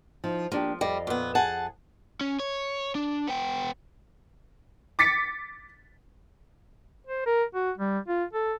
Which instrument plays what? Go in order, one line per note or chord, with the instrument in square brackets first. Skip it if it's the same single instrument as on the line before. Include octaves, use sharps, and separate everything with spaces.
[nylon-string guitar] F3 D#4
[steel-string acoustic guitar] F3 [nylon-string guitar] A#3 D4 G4
[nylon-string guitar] F2 D#5 F5 [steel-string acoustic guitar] G3
[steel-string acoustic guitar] A#2 B3
G#4 F#5 A5
[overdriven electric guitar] C#4
C#5
D4
B3 G5
[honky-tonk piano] D6 A6 B6 C#7
[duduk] C5
A#4
F#4
G3
F4
A4